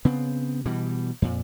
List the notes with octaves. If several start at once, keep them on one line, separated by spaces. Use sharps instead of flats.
C#3 B3 C4
B2 E3 G3
F2 A#2